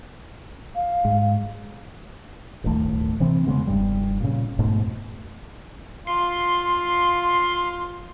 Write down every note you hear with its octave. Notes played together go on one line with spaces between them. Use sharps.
F5
G#2
D1 G1 D#2 A3
C3 E3 C4
E2 C#3 G#3 B3
F1 G2 G3
A#2 C#3
F2 G#2 B2 A3
F4 C6